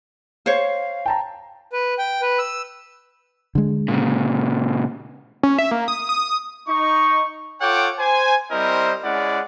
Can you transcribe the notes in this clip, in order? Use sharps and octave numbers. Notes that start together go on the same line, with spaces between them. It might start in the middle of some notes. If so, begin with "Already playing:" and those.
C5 C#5 F5
G5 A5 A#5
B4
G5
B4
E6
D3 G#3
A#2 C#3
C#4
E5
A#3
D#6
D#6
D#4 C#6
F4 A4 C#5 F#5 G5 D6
C5 G#5
G3 C4 E4 A#4 C5 D#5
G#3 C#4 E4 D5 F#5